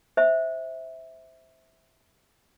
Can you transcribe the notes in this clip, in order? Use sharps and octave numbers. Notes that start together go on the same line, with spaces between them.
C5 E5